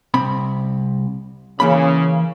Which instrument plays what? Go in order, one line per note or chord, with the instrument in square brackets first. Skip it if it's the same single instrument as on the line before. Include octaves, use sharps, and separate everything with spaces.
[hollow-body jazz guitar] C2 C4 B5
[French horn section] C#3 [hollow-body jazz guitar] E3 A#3 B5